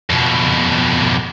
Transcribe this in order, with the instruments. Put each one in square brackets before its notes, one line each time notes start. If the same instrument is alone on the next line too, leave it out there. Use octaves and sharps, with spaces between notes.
[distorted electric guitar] F2 B2